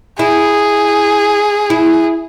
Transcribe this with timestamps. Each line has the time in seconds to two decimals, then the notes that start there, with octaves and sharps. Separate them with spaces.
0.19 E4 G#4
1.70 E4